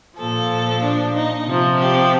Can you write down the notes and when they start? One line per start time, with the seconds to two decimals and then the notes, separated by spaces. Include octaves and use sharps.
0.17 A#2 F3 A4
0.81 D4
1.14 D#4
1.46 C3 F3
1.79 G4